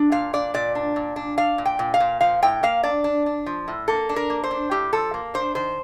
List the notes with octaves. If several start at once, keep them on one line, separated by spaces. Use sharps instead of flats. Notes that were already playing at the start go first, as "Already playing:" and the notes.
Already playing: D4
A#2 F5
D4 D5
A#2 D5
D4
A#2
D4
D4 F5
A#2
G5
A#2
F5
A#2
F3 F5
A2 G5
A#3 F5
D4 D5
D4
D4
F3
A2
A#3 A4
D4
A#4
A#3
C5
D4
A2 G4
F3 A4
A#3
D4 C5
D#3 C5